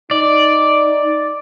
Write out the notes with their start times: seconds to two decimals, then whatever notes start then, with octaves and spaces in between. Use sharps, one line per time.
0.11 D#4 D5